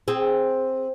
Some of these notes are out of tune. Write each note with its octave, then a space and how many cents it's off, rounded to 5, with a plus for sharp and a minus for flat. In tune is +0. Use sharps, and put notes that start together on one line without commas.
C4 +5 G#4 -5